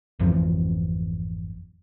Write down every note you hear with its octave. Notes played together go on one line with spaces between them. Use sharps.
G#1 F2 E3 F3